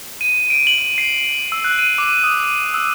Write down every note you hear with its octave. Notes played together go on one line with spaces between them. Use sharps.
D#7
D7
F#7
C7
E6
F#6
D#7
D6
D#6
E6